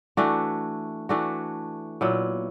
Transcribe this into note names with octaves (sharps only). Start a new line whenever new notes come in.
E3 A3 D4 F#4
E3 A3 D4 F#4
A#2 F#3 B3 E4